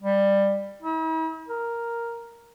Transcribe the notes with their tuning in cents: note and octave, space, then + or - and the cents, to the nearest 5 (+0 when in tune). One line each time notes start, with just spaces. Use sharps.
G3 +15
E4 -45
A#4 +0